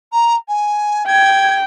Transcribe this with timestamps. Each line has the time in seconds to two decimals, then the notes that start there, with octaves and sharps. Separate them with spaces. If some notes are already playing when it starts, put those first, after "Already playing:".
0.12 A#5
0.48 G#5
1.07 G5 G#6